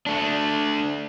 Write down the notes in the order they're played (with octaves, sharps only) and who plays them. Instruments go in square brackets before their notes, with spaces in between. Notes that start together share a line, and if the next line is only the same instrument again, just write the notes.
[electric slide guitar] A3 D4